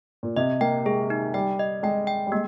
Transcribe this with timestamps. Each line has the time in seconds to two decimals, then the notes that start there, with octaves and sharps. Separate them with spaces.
0.23 A#2
0.36 C3 D#5
0.61 A#3 G5
0.85 G#3 G#4
1.10 D#4
1.34 G3 G5
1.59 D#5
1.83 G#3 G5
2.07 G5
2.27 G3
2.32 G#3 A#3